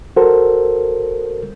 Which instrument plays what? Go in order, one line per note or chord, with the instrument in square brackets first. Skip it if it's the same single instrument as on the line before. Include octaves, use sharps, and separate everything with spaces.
[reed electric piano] F#4 A4 A#4 C5